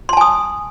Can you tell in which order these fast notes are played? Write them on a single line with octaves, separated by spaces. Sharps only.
C6 A5 G#5 D#6